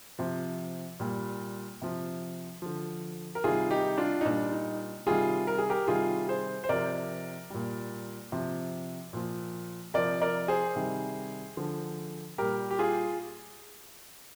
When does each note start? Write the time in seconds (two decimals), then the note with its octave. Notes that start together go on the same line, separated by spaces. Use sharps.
0.19 C3 F3
1.00 A#2 G3
1.82 C3 F3
2.62 D3 F3
3.35 A#4
3.44 C3 D#3 G3 F4 G#4
3.71 D#4 G4
3.98 D4 F4
4.21 D#4
4.25 A#2 G3 D4
4.52 D#4
5.06 C3 D#3 G3 F4 G#4
5.47 A#4
5.58 G#4
5.70 G4 A#4
5.87 C3 D#3 G3 F4 G#4
6.28 G#4 C5
6.64 C5
6.69 C3 F3 A#4 D5
7.50 A#2 G3
8.32 C3 F3
9.13 A#2 F3
9.94 C3 F3 A#4 D5
10.22 A#4 D5
10.48 G#4 C5
10.75 C3 D#3 G3
11.57 D3 F3
12.38 A#2 G3 G4 A#4
12.71 G4
12.79 F4 G#4